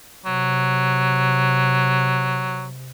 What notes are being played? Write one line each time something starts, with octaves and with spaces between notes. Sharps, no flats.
C3 F#3